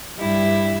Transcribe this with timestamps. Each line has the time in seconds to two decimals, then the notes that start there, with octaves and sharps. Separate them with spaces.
0.19 G2 G3 E4